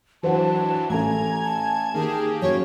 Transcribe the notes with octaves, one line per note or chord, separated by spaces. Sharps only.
E3 F#3 D4 F#4 C5 F#5 A5
A1 A3 G#5 A#5 G#6
A5
D#3 A#3 G4 G#4
F#2 C#5